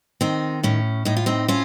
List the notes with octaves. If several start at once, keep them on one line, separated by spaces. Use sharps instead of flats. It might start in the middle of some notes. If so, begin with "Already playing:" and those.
D#3 C4 D#4
A2 C#4
A2 D#4
F4
C4 D#4
C4 C#4 F4